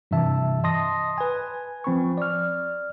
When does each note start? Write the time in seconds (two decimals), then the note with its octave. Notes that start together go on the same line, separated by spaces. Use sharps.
0.11 G2 C3 E3 E5 A5
0.64 D#5 A5 C6 D#6 A#6
1.18 B4 G#5
1.84 F3 C4 B5 C#6
2.18 D5 F6